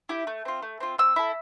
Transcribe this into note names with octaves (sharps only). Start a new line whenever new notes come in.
E4 G4
A3
C4 F4
A3
C4 F4
C4 E6
E4 A4